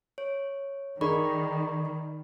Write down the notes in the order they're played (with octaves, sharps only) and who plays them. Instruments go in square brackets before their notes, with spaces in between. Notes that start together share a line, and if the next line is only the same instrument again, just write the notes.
[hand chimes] C#5
[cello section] D#3 [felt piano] D#4 G#4 A#4 [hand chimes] D5 B5 C#6